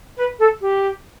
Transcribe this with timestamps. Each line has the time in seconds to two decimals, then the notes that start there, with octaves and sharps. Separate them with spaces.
0.17 B4
0.39 A4
0.61 G4